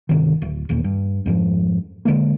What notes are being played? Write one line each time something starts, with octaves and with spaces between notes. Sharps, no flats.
G1 C3 D#3
D1
E1 D#2 A#2
G2
F2 G#2 F3
D3 F3 G#3 A#3